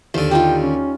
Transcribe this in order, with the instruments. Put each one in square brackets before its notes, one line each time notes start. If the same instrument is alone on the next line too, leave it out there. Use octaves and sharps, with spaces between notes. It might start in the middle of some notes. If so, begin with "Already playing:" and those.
[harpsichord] D#2 D3 [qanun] C5 F5
[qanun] G3 D#4 F4 [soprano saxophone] G5
[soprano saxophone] C#4